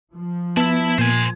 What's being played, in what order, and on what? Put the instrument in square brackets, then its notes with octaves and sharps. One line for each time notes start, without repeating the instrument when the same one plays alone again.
[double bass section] F3
[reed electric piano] B3 [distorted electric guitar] E4 E5 [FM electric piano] A5
[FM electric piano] A#2 [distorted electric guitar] C5 G#5